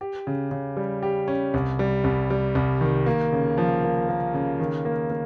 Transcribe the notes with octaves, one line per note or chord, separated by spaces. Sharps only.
G4
C#3
C#3
G3
G4
C#4
C2
G3
C2
G3
C2
D#3
A#3
C#3
F3
A#3
A#3
C#3
D#3
A#3
A#3